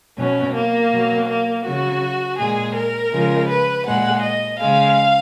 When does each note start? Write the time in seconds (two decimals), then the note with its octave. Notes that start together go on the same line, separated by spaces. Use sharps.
0.17 B2 F#3 C#4
0.55 A#3
0.91 B2 F#3
1.28 A#3
1.64 C#3 F#3 F#4
2.38 A#2 G#3 G#4
2.75 A#4
3.12 C#3 F3 G#3
3.49 B4
3.86 A#2 G#3 F#5
4.22 D#5
4.59 C#3 G#3 F5